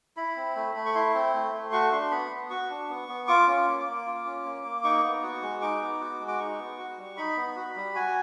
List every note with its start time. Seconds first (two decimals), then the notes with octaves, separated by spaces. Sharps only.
0.17 E4 B5
0.36 C4
0.55 A3
0.75 A3
0.86 C#6
0.95 E4 C6
1.14 C4
1.33 A3
1.52 A3
1.72 F#4 C#6
1.92 D4 C6
2.11 B3 B5
2.31 B3
2.50 F#4 C#6
2.70 D4
2.89 B3
3.08 B3
3.28 F4 D6
3.47 C#4
3.67 A#3
3.86 A#3
4.06 F4
4.26 C#4
4.45 A#3
4.64 A#3
4.84 D#4 C#6
5.03 B3
5.23 F#4
5.42 G#3
5.61 D#4 D6
5.81 B3
6.01 F#4
6.20 G#3
6.28 D6
6.39 D#4 C#6
6.59 B3
6.78 F#4
6.98 G3
7.17 D#4 B5
7.37 B3
7.56 F#4
7.76 G3
7.95 F#4 G#5